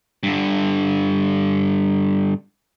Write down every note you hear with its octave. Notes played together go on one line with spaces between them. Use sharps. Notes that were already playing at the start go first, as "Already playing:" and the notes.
G2 D3